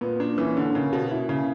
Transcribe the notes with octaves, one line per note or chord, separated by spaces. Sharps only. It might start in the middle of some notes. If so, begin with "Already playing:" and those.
A#2 B3
D4
E3 C#4
D3
C#3 A#3
B2
E4
C#3